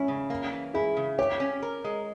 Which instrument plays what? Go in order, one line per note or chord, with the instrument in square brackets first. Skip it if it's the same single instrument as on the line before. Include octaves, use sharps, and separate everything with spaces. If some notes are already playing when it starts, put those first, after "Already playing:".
Already playing: [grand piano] C#4 [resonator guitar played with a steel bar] E4
[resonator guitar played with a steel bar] C#3
A#3
E3
[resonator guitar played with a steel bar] E4 [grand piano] G#4
[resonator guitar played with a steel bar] C#3
[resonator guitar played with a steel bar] G4 [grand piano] C#5
[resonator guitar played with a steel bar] C#4
A#4
G#3